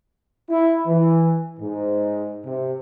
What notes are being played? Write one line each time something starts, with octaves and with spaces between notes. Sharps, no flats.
E4
E3
G#2
C3